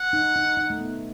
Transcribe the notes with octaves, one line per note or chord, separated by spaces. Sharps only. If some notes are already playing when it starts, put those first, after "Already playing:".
Already playing: F#5
D#4
D#4
D#4
A3
B3